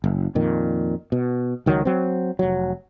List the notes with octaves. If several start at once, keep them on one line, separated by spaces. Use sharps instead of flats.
F#1
F2 A#2 D#3
B2
C#2 D#3 F3 F#3
F#3 C4
F1 F#3